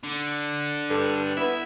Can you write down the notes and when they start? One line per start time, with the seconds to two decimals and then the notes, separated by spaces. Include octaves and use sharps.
0.04 D3
0.90 G2 A4
1.37 B3 E4